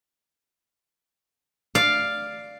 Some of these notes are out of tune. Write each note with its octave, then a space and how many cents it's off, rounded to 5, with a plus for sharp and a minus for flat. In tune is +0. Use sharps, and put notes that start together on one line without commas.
D5 +0 F5 +0